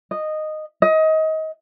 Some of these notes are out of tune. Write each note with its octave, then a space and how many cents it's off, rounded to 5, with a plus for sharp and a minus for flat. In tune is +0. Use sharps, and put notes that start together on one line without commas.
D#5 -10
D#5 +25